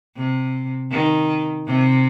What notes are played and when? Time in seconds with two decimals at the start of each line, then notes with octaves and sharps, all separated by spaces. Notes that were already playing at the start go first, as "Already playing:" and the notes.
0.16 C3
0.91 D#3
1.66 C3